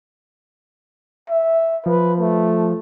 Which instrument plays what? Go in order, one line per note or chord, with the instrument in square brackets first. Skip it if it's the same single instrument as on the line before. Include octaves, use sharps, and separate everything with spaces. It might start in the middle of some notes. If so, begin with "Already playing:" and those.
[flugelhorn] E5
[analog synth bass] F3 [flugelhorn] B4
[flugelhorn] A3